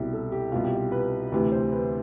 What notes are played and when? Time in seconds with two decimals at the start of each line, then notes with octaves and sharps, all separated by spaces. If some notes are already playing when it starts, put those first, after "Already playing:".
Already playing: C2 B2 E4 G4
0.13 A4
0.32 G4
0.52 C2 B2 F4
0.64 G4
0.75 F4
0.92 B4
1.32 D2 C3 E3 B4
1.52 C5
1.72 B4